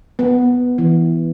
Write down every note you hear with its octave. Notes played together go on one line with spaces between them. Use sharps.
B3
E3